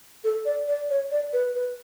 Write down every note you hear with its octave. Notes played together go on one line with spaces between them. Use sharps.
A4
D5
D5
C#5
D5
B4
B4